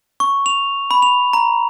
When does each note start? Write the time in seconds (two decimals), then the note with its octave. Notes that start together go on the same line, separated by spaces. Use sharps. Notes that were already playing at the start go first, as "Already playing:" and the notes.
0.20 C#6
0.46 F7
0.91 B5
1.02 F7
1.33 A#5